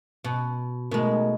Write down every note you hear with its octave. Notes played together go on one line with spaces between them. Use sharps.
B2
B2 G#3 A3 D#4 A#4